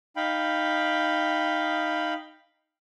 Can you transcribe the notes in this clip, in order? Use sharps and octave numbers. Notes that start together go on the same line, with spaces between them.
D#4 F5 G5 B5